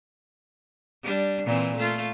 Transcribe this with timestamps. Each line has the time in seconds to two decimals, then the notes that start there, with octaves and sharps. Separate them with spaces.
1.04 G3 D4
1.45 A#2 E3 C4
1.77 A3 F4